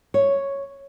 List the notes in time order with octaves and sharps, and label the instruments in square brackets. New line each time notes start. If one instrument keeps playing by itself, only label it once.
[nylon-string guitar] C#5